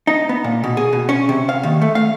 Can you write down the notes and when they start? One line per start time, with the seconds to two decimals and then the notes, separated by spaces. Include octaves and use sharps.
0.07 D#4
0.29 B3
0.44 A#2
0.64 B2
0.77 G#4
0.93 B2
1.09 C#4
1.29 C3
1.49 F5
1.63 D#2
1.82 A3
1.95 F5